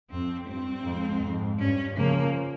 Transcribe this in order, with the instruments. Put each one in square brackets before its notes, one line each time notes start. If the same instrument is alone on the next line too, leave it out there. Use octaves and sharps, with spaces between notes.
[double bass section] F2 [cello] C4
[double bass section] G2 [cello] C4
[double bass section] F2 G#2
F2 G#2
[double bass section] G2 [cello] C#4
[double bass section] C#3 F3 [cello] A#3